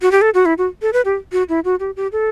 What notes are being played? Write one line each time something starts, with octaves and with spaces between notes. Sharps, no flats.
F#4
G4
A4
F#4
E4
F#4
A4
B4
G4
F#4
E4
F#4
G4
G4
A4